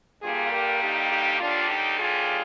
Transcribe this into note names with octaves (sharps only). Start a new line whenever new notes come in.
G2 D3 G3 A#3 F4 G#4
G4 A#4
D#4 G4
D#4 G4
D#2 D3 G3 D4 F4
D#4 G4
F4 G#4